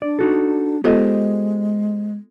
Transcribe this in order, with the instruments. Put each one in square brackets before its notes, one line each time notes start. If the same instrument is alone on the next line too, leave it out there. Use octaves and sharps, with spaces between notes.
[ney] D4 [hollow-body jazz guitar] D5
[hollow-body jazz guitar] D#4 F#4 A4
[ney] G#3 [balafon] B3 F4 A4 [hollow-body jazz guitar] G4 C5 D#5